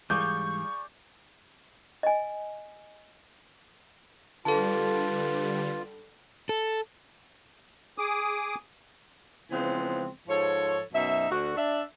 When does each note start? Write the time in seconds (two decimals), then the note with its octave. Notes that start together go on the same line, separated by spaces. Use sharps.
0.10 G#2 E3 G3 G#4 D5 F5 C#6 G6
2.03 D#5 G#5
4.45 D3 G3 F4 A4 B4 A5
6.49 A4
7.98 G#4 D6 D#6
9.51 C#3 E3 F3 G#3 B3 C4
10.28 G#2 F3 A4 C#5
10.94 F#2 B2 D#4 E5
11.30 D2 D3 F#4
11.56 D4 E5